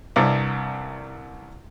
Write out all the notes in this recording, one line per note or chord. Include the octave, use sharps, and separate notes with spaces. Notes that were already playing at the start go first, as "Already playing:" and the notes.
C2 G2 C3